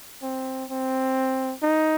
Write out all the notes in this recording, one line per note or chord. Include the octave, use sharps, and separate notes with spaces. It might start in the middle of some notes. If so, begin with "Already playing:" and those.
C4
C4
D#4